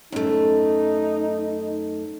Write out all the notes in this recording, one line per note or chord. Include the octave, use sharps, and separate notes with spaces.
F#2 A3 D#4